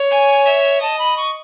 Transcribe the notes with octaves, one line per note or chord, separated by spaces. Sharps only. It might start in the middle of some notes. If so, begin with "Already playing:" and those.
Already playing: C#5
G#5
E5
D#5 A5
B5
C#6